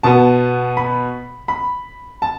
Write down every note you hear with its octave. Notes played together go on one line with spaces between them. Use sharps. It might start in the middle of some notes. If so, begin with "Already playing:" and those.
B2 B3 A5
B5
B5
A5